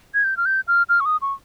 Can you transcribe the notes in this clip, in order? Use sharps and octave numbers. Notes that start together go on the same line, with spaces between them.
G#6
G6
F6
G6
F6
F6
C#6
D#6
C#6